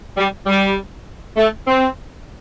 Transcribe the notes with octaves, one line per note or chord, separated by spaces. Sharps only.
G3
G3
A3
C4